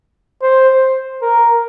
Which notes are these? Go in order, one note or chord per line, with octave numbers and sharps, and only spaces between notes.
C5
A#4